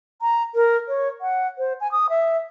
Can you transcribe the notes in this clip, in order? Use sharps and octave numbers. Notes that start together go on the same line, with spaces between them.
A#5
A#4
C#5
F#5
C5
G#5
D#6
E5